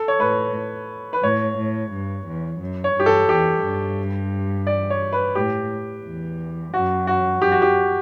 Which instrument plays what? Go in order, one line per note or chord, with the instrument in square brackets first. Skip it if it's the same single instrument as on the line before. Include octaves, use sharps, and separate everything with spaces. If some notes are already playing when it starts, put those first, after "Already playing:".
Already playing: [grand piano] A4
C#5
[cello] A2 [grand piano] B4
[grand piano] B4
[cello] A2 [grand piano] C#5
[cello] A2
G2
E2
F#2
[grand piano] C#5
[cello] G2 [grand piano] G4
[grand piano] A4
[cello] E2 [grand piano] G4
[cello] G2
[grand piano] D5
C#5
B4
[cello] A2 [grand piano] G4
[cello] E2
[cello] F#2 [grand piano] F#4
[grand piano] F#4
[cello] F#2 [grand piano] G4
[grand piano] F#4
G4